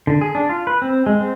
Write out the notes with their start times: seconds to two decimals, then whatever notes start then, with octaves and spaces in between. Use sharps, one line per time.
0.07 D3
0.21 G#4
0.35 D4
0.49 F4
0.67 B4
0.82 C4
1.06 G#3
1.21 C4